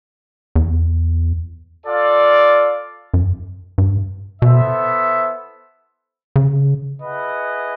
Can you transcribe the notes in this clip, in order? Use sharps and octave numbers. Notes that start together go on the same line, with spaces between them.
E2
F4 A4 D5 F5
F#2
G2
B2 B3 E4 A4 C5 E5
C#3
E4 G#4 B4 D#5 F#5